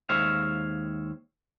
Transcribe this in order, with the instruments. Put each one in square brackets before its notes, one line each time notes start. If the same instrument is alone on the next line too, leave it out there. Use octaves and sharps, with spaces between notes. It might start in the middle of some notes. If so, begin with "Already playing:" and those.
[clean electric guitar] D#2 G#3 C5 C#5 E5 F5